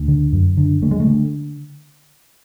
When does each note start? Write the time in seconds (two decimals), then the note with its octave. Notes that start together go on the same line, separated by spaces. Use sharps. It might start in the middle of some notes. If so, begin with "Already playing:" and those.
Already playing: D2
0.08 D3
0.33 F#2
0.57 D3
0.82 D3 A3
0.91 G#3
1.00 A3
1.07 D3